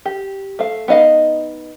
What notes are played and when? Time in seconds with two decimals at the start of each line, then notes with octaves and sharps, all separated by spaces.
0.06 G4
0.59 A3 F5
0.88 B3 D#4 D#5 F5